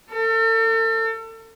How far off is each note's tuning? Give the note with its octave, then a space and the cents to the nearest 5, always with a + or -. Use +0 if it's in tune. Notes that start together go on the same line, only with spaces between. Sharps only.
A4 +40